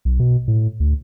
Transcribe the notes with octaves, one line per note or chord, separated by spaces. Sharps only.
B1
B2
A2
D2